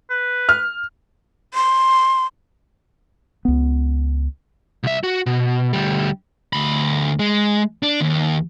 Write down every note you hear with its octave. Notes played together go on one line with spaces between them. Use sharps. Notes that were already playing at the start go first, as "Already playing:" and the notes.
B4
F6
C6
C#2 B3
C2 E5
F#4
B2
D2 G3
D2 B5
G#3
D4
D#2